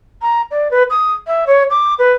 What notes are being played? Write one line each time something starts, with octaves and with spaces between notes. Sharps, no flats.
A#5
D5
B4
D#6
E5
C#5
D6
B4